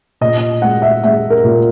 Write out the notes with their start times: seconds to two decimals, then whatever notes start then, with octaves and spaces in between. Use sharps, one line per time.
0.21 A#2 D#5
0.62 G#3 F#5
0.82 E5
1.03 G#3 E5
1.30 A#4
1.44 A#2